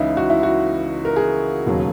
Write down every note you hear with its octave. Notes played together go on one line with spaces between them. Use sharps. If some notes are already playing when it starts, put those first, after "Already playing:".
Already playing: C#2 C#3 E3 D#4 E4
F#4
E4
F#4
A#4
G#4
E1 D#2 C#3 F#3